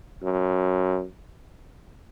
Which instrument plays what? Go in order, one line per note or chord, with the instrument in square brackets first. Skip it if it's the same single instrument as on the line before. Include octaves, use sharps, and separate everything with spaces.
[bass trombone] F#2